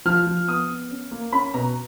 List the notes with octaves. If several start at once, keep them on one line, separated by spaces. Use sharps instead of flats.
F3 F6
F3
B3 D#6
B3
C#4
A#3
C#4 B5
B2 A#5